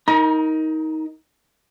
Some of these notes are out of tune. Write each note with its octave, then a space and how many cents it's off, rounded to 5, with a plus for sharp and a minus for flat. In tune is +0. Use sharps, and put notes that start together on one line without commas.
D#4 +20 A#4 +0 A#5 +45